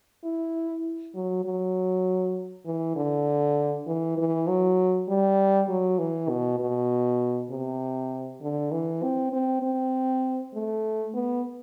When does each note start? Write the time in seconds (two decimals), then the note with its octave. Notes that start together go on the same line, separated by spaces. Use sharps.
0.24 E4
1.15 F#3
1.45 F#3
2.66 E3
2.96 D3
3.87 E3
4.18 E3
4.48 F#3
5.08 G3
5.69 F#3
5.99 E3
6.29 B2
6.60 B2
7.50 C3
8.41 D3
8.72 E3
9.03 C4
9.33 C4
9.62 C4
10.54 A3
11.14 B3